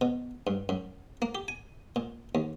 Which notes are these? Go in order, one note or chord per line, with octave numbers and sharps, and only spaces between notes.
B2
G2
F#2
A#3
G4
G#5
A#2
D#2